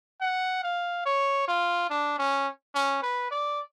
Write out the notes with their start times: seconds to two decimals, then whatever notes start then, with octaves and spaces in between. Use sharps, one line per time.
0.21 F#5
0.64 F5
1.06 C#5
1.48 F4
1.90 D4
2.18 C#4
2.75 C#4
3.03 B4
3.31 D5